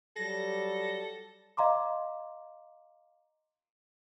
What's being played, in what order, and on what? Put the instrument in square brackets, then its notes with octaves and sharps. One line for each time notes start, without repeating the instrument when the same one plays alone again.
[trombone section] F#3 G3 [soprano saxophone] A4 [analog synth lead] A#6
[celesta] D#5 F5 A#5 C6 D6